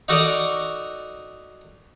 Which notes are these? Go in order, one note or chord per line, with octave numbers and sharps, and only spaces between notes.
D#4 F#4 A4 A#4 D5 D#5